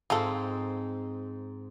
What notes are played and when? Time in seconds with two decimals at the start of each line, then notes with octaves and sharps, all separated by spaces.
0.10 G#2 C4 D#4 F4 A4